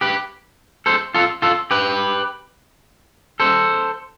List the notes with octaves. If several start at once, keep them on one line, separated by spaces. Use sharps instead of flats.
G4 B4
A4 C5
F4 A4
F4 A4
G4 B4
A4 C5